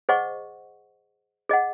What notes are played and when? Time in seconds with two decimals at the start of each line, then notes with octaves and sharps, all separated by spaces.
0.09 G#4 C5 D#5 F#5 C#6
1.49 G#4 D#5 F#5